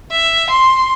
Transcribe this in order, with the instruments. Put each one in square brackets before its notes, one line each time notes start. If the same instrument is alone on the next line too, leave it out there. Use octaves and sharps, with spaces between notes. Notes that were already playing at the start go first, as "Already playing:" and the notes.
[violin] E5
C6